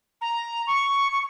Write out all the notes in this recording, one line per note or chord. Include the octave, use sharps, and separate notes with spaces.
A#5
C#6
C#6